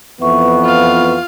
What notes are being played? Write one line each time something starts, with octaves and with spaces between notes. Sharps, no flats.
F2 E3 B3 E5 C#6
F4 F5